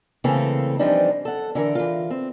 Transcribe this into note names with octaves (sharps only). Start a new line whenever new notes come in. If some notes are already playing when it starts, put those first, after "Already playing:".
C#3 E3 A3 A#3 C4 A4
E3 F3 G3 C4 D4 D#4
A4 F#5
D3 E3 A#4
E3 F4
C4